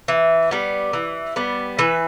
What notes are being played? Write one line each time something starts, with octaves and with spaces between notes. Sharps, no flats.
E3
G3 B3
E3
G3 B3
E3 B4